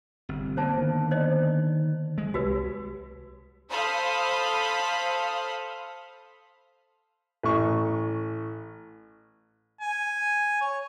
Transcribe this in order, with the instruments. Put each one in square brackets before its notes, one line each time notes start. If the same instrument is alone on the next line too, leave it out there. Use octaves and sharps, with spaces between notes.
[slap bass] G1 [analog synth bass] C3
[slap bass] D3 A#3 B3 [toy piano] C5 A5
[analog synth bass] D#3
[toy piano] C5 D5 D#5
[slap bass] G#3
[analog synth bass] C2 [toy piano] F#4 G4 B4
[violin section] A4 C5 F5 B5 D#6
[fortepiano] A1 C#6
[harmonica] G#5
C#5